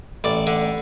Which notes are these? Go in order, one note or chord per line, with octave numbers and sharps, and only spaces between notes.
A1 D5
D3